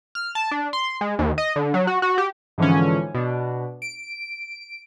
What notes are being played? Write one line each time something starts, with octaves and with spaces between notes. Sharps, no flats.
F6
A5
D4
C6
G#3
D#2
D#5
D3
F#3
F#4
F#4
G4
G#2 D3 E3 F3 C#4
B2 D4
D7